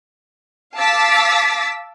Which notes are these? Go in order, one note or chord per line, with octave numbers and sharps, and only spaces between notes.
F5 A5 D6 E6 A6 B6